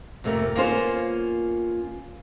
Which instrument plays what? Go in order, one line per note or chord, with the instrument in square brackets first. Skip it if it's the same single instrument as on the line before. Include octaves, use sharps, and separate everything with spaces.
[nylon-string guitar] F2 C3 A3 A#3 A#4
A#3 B3 C#4 F4 A#4 C5